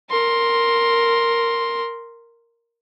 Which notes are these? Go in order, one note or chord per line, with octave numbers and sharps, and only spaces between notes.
A#4 C6